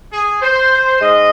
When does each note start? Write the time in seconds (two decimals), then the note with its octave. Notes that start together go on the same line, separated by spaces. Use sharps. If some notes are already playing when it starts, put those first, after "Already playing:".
0.13 G#4
0.42 C5
1.00 G#2 G#3 D#5